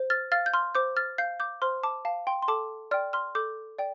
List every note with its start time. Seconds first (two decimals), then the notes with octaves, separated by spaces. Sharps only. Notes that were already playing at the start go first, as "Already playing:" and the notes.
Already playing: C5
0.10 F6 A6
0.32 F5 F6 A6
0.46 G6
0.54 C6 F6
0.75 C5 D6 G6
0.97 F6 A6
1.18 F5 G6 C7
1.40 D6 G6
1.62 C5 C6 F6
1.83 A5 D6
2.05 F5 A5
2.27 G5 C6
2.43 C6
2.48 A4 A5 D6
2.91 D5 G5 C6 F6
3.13 C6 F6
3.35 A4 D6 G6
3.78 D5 G5